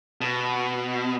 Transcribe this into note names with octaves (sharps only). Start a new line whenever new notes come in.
B2